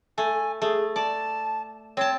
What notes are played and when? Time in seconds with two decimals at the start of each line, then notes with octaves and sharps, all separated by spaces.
0.18 A3 G#5
0.62 A3 G#4
0.96 D5 A5
1.97 C4 C#5 A5